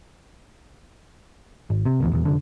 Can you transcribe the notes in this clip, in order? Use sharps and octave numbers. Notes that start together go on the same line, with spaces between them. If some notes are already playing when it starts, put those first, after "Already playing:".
G#1
C3
D1 A1 E2
D#1 E2
F1 A#1 D3